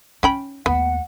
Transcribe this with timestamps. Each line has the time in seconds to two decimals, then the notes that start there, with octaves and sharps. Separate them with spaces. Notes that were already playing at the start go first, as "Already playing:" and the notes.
0.23 C#4 D#4 G5 B5
0.66 D#2 A3 B3 F#5